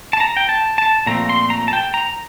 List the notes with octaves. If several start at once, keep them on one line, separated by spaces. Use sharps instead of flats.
A5
A#5
G5
A5
A5
A#2 F3 A3 C4 A#5
C6
A#5
A5
G5
A#5